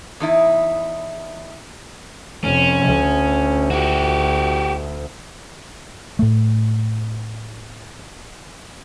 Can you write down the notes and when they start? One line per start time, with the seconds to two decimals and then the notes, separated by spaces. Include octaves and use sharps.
0.20 E2 D#4 E4
2.44 F1 C#4
2.85 D2
3.71 F#4 G4
6.19 A2 A3